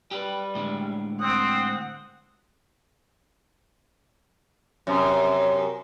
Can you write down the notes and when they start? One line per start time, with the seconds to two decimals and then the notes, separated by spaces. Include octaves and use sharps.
0.11 G3 G4 G#4 B4
0.55 A2 D3 G#3
1.20 C4 F#5 D#6
4.87 F#2 C3